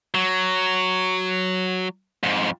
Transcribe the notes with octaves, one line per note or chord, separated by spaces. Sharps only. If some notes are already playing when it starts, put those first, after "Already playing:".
F#3
F2 G#2